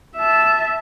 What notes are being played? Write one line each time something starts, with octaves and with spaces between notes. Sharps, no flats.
E5 A5